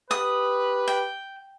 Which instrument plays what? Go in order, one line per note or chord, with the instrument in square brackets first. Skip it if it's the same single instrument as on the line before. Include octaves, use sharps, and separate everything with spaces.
[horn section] G4 B4 [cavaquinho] D#6
[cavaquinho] G5